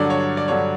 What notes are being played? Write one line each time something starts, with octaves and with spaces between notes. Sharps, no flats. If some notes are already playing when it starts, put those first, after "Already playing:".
Already playing: G2 D3 F#3 D5
C#5
D5
G2 D3 F#3 C#5